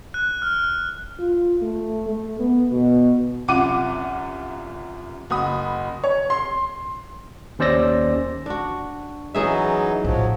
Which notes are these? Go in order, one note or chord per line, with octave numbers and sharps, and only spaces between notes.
F#6
F6
F4
A3
A3
B3
B2
C2 F#2 F4 F#5 D6 D#7
F#1 F#4 B5 D#6
C#5
C6
D#2 C#4 C5 D5 E6 A#6
D4 F#4
E3 F#3 C#4 D#4 G#4 E5
A1 A2 F3 F#3